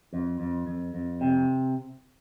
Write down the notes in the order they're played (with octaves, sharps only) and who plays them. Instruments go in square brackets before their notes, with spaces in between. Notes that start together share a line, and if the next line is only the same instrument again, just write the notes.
[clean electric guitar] F2
F2
F2
F2
C3